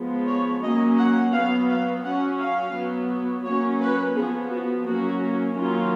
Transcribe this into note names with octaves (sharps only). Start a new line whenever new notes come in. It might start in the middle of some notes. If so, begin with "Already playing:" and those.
Already playing: F3 G#3 B3
C#5
F#3 A#3 C#4 D#5
F#5
F#3 B3 F5
F5
F#3 C#4 F#5
F5
F#3 B3
F#3 A#3 C#4 C#5
B4
F3 B3 G#4
F#4
F#3 A#3 C#4 F#4
D#3 F#3 A#3 C#4 F4